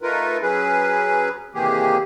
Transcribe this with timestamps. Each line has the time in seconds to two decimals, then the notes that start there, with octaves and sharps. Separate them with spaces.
0.02 A3 D#4 F4 A#4 B4
0.42 F#3 C#4 G#4 B4
1.54 C3 D#3 E3 A#3 G4 G#4